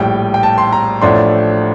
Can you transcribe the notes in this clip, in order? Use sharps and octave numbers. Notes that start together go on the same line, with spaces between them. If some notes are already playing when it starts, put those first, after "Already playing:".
Already playing: A#1 A2 G3 G5
G5
A5
C6
A#5
A1 A2 F3 A3 D4 C6